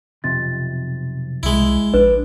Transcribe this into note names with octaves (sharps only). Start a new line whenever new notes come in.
B1 F2 C3 A6
C2 G#3 E4
A#1 D4 B4